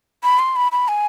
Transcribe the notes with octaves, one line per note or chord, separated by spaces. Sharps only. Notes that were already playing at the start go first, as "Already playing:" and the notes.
B5
C6
B5
B5
G#5